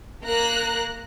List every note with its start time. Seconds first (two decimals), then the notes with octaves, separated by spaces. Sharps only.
0.25 A#3 A#5 F#6